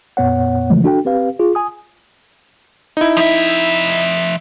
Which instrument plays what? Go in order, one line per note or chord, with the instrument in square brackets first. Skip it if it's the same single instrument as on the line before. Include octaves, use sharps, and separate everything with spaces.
[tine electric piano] F2 A#2 B3 C#5 F#5
C#3 E3 F3 G#3 A3
D4 F#4 A4 G5
C4 G4 B4 F5
F4 G#4
G#5 D#6
[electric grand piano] D#4 E4
[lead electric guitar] F3 E5